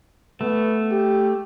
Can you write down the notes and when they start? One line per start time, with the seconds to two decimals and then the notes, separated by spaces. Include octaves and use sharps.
0.41 A3 B3
0.92 G4